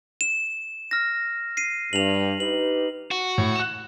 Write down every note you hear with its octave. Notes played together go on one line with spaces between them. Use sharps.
E7
F6 A#6
C7 D#7
G2 F7 F#7
D#4 G4 B4 F#7
F#4
A2
F#6 E7